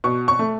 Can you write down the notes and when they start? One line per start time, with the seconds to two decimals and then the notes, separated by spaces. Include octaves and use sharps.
0.04 B2 C#6
0.28 C#6
0.39 A3